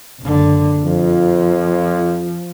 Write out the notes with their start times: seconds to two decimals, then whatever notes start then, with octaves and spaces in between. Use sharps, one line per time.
0.20 F#1 D3
0.84 F2 F3